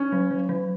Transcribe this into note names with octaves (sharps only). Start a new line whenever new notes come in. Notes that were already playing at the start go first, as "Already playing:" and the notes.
Already playing: C#4
F#3
F#3
F#3